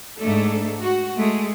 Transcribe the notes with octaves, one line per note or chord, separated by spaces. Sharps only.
G#2 A3 D4 A4
F#4
G#3 A3